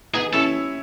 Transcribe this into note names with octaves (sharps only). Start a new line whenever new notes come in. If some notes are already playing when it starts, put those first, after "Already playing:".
B3 D#4 G#4
C#4 E4 A4